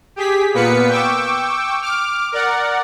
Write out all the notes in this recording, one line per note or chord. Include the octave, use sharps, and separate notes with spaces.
G4 G#4 B6
A#2 A#3 B3 B4 B6 C#7
G5 C#6 D6 E6
D6 F6
A#4 D5 F#5